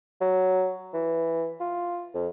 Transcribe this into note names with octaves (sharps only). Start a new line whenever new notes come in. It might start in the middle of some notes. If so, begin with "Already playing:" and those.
F#3
E3
F4
F2